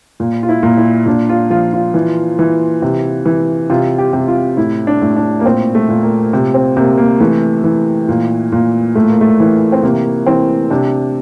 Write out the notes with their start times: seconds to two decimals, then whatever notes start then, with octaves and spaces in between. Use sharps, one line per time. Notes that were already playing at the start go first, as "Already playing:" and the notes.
0.20 A#2
0.43 F4
0.49 E4
0.63 A#2
0.77 E4
1.06 A#2 D4
1.29 F4
1.50 F3 F4
1.73 F4
1.94 E3
2.39 E3
2.82 C3
3.26 E3
3.70 C3 F4
3.98 G4
4.13 C3
4.28 F4
4.57 A2 E4
4.87 D4
5.02 A2
5.16 D4
5.40 A#3
5.44 A#2 C4
5.75 A3
5.89 A#2
6.03 A#3
6.33 C3
6.54 C4
6.77 C3 A#3
6.98 A#3
7.20 E3 A3
7.64 E3
8.09 A#2
8.52 A#2
8.95 A2 A3
9.09 A#3
9.21 A3
9.40 E3
9.72 C4
9.83 C3 A#3
10.26 E3 C4
10.70 C3 D4